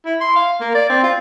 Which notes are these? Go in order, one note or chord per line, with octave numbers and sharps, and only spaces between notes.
E4
C6
F5
A#3
D5
C4
F4